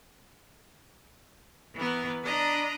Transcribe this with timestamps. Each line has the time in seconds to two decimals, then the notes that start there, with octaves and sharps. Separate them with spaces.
1.76 E3 B3 A#4 B4
2.24 D4 D#5 A#5 B5